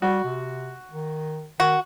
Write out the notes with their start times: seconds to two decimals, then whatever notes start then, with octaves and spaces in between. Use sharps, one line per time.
0.02 G3 F#4
0.24 C3
0.90 D#3
1.60 D#3 F#4